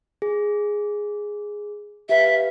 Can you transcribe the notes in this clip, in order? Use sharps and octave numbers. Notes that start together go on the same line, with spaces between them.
G#4
G4 B4 E5 F5